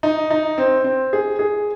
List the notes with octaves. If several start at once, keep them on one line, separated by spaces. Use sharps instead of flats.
D#4
D#4
C4
C4
G#4
G#4